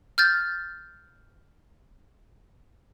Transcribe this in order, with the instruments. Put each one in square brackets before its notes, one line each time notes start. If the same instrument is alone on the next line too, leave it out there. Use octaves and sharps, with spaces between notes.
[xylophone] F6 G6 A6